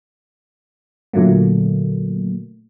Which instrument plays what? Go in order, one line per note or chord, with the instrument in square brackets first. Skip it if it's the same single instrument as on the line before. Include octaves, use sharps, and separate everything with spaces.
[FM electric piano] A#2 D3 F#3 A3 A#3